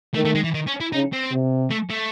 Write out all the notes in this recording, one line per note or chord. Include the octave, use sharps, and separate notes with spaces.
D#3 A3
A3
G#3
E3
D#3
C#4
E4
C#3 D#4
C4
C3
A3
A3